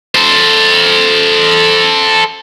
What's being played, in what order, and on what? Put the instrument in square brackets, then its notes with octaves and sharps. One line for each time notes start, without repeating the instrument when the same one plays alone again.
[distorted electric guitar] A4 C5